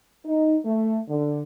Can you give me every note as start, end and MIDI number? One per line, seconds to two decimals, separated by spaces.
0.25 0.55 63
0.63 0.98 57
1.08 1.40 50